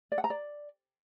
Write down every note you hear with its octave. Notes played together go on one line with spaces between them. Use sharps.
D5
F#5
A#5
D5